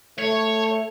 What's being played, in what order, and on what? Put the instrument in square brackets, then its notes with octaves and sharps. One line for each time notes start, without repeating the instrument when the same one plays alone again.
[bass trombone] A3 [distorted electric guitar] C#5